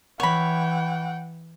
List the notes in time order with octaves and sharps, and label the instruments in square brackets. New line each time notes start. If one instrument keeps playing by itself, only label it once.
[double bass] E3 [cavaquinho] C#5 B5 [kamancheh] F#5 G5